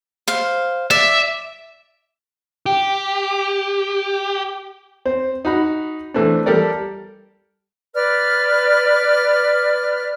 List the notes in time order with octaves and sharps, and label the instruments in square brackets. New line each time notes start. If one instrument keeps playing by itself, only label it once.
[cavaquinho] C5 F5
[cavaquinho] D5 [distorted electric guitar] E5
[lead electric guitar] G4 [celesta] G5
[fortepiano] C4 C5
D#4 F#4 B5
E3 A3 C4 D4
G3 G4 A4 A#4 D5
[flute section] B4 D5 F6